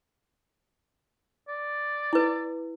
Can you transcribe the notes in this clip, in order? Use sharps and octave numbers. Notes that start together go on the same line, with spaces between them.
D5
E4 B4